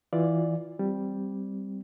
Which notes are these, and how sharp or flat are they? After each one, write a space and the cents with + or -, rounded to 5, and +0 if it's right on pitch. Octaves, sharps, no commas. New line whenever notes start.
E3 -5 F4 +5 D5 +0
G3 +0 C4 +0